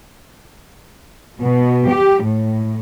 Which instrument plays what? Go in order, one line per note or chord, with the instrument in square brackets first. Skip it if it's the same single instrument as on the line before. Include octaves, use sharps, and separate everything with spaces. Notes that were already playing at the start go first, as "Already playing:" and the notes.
[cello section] B2
G4
A2